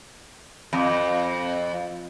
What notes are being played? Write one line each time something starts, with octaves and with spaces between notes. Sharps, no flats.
F2